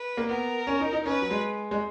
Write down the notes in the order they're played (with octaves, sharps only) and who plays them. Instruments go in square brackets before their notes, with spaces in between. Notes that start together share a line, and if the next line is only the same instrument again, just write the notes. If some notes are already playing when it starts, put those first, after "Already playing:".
Already playing: [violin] B4
[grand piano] A#3
[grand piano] B3 [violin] A#4
[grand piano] C#4
D#4
D#4
[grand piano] C#4 [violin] B4
[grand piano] F#3
G#3
G#3